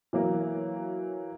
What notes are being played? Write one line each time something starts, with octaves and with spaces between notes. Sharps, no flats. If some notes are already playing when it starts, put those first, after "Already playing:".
E3 F#3 A#3